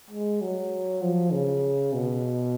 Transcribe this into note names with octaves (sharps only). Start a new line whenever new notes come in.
G#3
F#3
F3
C#3
B2